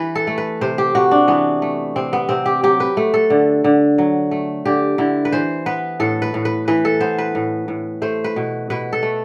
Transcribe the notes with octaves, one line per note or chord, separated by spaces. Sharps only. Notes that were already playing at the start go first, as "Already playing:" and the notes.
Already playing: E3 B4
A4
A3
B4
C3 C5
G4
C3 F#4
D4
E3 B3
A3
C3 C4
B3
C3 C4
G4
F#3 G4
B4
A3
A4
D3
D3
F#3
A3
D3 G4
D3 E4
B4
E3 C5
B3 B4
A2 A4
B4
A2
B4
E3 B4
A4
B3 C5
B4
A2
A2
A3 C5
B4
B2
B2 B4
A4
A3